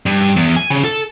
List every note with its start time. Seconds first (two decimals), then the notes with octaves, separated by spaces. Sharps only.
0.06 G2
0.36 E2
0.56 G#5
0.70 C#3
0.84 A4